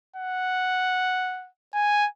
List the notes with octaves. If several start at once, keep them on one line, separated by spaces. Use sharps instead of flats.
F#5
G#5